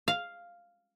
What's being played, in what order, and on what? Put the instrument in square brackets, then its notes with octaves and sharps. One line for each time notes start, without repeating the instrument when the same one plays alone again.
[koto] F5